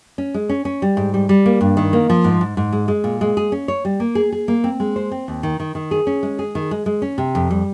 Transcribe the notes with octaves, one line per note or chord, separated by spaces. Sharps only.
C#4
G#3
C#4
C#4
G3
G#2
G3
G3
A#3
G2
D#3
A#3
F3
G#2
G#2
G#2
G#3
G#3
A#2
G#3
G#4
C#4
C#5
G3
A#3
G#4
G#4
A#3
C4
G#3
C5
C4
D#2
D#3
D#3
D#3
G#4
C#4
G#3
G#4
D#3
G#3
G#3
C#4
C3
F2
G3